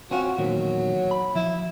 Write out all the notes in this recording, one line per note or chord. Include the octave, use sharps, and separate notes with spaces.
C4 C#4 F4 F#4
E2 A#2 D#3 F#3
B5
F3 E4